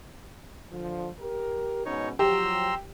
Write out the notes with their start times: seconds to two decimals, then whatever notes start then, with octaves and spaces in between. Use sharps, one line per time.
0.72 D3 F3
1.20 G4 A#4
1.86 G#2 B2 C#4 D#4 C#5
2.19 F3 F#3 G4 A#5 C6 E6